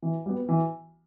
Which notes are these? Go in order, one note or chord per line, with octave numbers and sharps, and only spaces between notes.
E3
G3 B3
E3